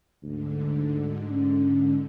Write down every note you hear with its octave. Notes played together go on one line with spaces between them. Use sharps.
D2 G#2 D3
C#4